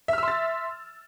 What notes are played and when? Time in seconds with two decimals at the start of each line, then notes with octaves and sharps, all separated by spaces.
0.08 E5
0.13 F6
0.18 E6
0.23 C6
0.28 A6